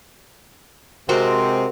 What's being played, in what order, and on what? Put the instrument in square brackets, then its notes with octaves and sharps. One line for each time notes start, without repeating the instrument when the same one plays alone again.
[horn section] C3 G#3 C4 [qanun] F#4 A#4 C5